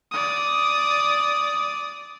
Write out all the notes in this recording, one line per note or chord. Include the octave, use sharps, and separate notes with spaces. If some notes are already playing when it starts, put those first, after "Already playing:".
D5 D#6